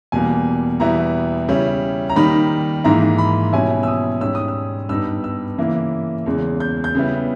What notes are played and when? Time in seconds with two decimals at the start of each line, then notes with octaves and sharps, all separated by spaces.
0.12 E2 B2 G3 A#3 G#5
0.80 E2 B2 G3 B3 E4 A#5
1.48 C#3 G3 C#4 E4
2.10 A#5
2.16 D#3 G3 A#3 D#4 B5
2.84 G#2 E3 A#3 E4 A#5
3.18 B5
3.53 B2 G3 C#4 E4 G#5
3.83 E6
3.88 D#6
4.21 G#2 G3 C#4 E6
4.35 D#6
4.48 E6
4.89 G2 G3 B3 D#4 E6
5.24 E6
5.58 C#3 E3 A#3 E4
6.26 E2 C#3 G#3
6.60 G6
6.84 G6
6.95 C#3 G3 B3 E4